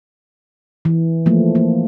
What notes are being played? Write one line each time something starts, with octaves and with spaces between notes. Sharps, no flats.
E3
F3 A3 A#3
A#3